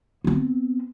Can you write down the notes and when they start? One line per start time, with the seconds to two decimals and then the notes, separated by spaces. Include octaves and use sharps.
0.24 B3 C4